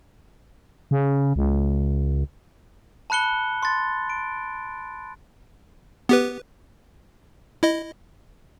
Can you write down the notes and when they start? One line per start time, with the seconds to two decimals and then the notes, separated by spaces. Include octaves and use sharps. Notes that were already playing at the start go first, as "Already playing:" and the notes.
0.91 C#3
1.36 C#2
3.10 A5 B5 F#6 C#7 G7
3.63 C6 A6
4.10 D7
6.09 B3 G4 B4
7.63 E4 D#5